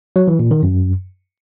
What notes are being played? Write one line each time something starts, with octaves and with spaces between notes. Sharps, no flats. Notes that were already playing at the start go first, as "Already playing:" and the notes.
F#3
E3
A#2
D#3
F#2